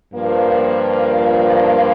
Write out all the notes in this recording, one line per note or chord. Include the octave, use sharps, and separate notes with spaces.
G2 F3 A#3